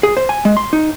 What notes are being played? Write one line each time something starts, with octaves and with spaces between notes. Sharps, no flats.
G#4
C5
G#5
G#3
C6
D#4